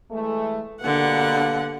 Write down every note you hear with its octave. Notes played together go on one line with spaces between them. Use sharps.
E3 G#3 A3
G2 B2 D3 A#3 F#5